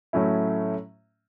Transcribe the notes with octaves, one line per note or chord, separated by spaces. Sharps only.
A2 F#3 A3 C#4 E4